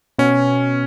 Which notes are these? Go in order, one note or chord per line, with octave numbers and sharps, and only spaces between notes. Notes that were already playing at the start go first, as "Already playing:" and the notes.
B2 C#4